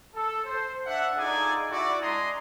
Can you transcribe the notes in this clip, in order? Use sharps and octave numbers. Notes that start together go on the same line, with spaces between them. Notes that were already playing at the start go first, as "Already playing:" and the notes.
A4
C5
D4 E5 F#5
D#4 F4 G#4 A4 D5 G#5
E4 F#4 D5
G#3 D4 G#5 A#5 C6 D#6